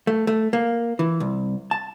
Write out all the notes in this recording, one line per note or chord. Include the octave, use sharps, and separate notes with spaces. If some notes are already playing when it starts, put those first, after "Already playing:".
A3
A3
A#3
E3
C2
A5